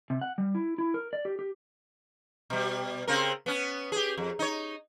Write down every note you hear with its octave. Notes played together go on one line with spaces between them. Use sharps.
C3
F#5
G3
E4
E4
A#4
D5
G4
G4
B2 G3
C#3 C4 A#4
B3 C#4
G4 G#4
F2
D#4 C#5